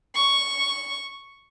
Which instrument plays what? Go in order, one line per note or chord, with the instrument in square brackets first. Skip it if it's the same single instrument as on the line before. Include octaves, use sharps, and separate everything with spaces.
[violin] C#6